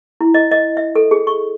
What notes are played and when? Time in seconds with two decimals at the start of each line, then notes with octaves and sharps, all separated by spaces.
0.21 E4
0.34 D#5
0.51 D#5
0.77 E5
0.95 A4
1.11 G#4
1.27 C#6